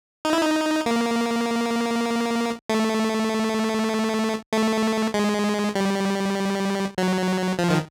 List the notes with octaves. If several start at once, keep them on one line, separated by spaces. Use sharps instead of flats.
D#4
E4
D#4
A#3
A3
A3
G#3
G3
F#3
F3
D#3